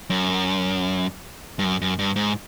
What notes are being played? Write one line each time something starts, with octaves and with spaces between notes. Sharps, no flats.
F#2
G2
F#2
F#2
G2
G#2